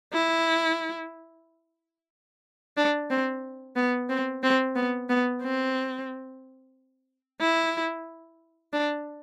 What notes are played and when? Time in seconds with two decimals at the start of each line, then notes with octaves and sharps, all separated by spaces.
0.13 E4
2.77 D4
3.10 C4
3.76 B3
4.09 C4
4.43 C4
4.75 B3
5.09 B3
5.42 C4
7.41 E4
8.73 D4